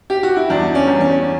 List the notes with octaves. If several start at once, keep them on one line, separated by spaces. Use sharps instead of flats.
G4
F#4
E4
E2 D4
C#4
E2
C#4